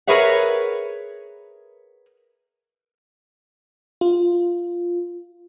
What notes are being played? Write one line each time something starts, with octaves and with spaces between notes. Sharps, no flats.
G#4 A#4 B4 C#5 E5 F#5
F4